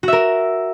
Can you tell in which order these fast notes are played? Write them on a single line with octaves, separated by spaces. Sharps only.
F#4 E5 A#4